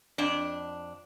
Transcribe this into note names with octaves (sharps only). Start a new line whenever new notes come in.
F2 D4